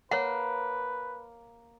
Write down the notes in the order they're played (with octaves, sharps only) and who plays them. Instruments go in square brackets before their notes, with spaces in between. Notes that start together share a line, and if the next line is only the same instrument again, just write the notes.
[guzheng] A#3 [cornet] B4 [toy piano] C#5 F#5